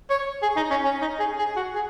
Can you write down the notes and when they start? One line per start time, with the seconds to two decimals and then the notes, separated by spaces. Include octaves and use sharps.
0.10 C#5
0.42 G#4
0.56 D#4
0.70 C#4
0.84 C#4
1.01 D#4
1.19 G#4
1.38 G#4
1.56 F#4
1.75 G#4